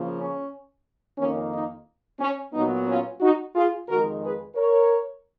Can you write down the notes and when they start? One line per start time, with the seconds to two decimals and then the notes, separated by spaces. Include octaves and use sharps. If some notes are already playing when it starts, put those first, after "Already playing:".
Already playing: C#3 F3 A#3
0.18 C#4
1.18 F2 D#3 A#3 C#4
1.52 D#4
2.20 C#4
2.53 A#2 F#3 B3 D#4
2.87 C#4 F4
3.20 D#4 F#4
3.54 F4 G#4
3.88 F2 D#3 G#3 F#4 A#4
4.22 G#4 B4
4.56 A#4 C#5